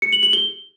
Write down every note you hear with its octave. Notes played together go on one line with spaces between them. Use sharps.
C#7
F#7
F#7
G7